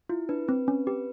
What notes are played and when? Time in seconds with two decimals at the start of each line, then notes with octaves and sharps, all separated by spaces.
0.09 E4 F4
0.29 D4 B4
0.48 C4 B4
0.67 C4 C#4
0.87 G4 B4